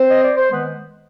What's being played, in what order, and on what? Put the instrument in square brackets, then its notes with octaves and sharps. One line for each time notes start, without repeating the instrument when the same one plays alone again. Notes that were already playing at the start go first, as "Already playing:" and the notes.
Already playing: [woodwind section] C4 C5
D#5
D5
C5
D#3 G#3 B3 B4